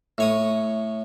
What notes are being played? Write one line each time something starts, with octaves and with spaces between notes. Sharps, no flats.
A2 C#5 D#6